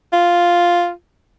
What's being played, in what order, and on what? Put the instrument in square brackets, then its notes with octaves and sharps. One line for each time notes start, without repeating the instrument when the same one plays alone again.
[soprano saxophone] F4